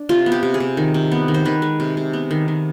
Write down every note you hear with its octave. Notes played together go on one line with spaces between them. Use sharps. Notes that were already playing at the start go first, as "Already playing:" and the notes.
Already playing: D4
C3 F4
B3
G4
C3
G#4
C3
D#3
C3
B3
D#3
C5
D#3 B4
G#3
C3
C3
B3
D#3
D#3